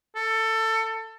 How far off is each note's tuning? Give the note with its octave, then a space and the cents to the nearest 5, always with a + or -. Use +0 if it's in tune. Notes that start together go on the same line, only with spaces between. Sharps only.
A4 +20